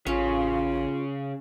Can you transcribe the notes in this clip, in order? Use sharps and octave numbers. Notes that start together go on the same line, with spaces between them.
A1 C#3 C#4 F4